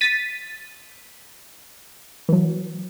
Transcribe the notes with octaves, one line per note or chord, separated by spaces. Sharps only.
A6 B6 D#7
E3 F#3